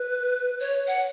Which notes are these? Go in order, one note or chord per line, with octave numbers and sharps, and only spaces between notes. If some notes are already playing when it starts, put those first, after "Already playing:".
Already playing: B4
C#5
F#5